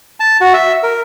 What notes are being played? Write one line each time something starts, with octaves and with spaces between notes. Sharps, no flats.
A5
F#4
E5
A#4